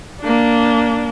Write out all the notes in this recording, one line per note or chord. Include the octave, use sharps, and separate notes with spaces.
A#3 D4